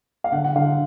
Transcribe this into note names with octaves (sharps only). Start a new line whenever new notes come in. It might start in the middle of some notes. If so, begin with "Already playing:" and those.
F5
D3 F#5
F#5
D3 F5